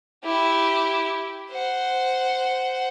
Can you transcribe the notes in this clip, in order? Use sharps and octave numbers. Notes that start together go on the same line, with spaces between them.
E4 G4
C5 F#5